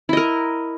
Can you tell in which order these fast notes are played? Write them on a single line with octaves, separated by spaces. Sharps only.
E4 D#5 A#4